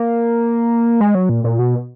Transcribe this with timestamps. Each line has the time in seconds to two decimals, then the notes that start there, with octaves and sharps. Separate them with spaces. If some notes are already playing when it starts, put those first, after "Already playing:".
Already playing: A#3
1.00 G#3
1.15 F#3
1.29 A#2
1.44 A#2
1.59 B2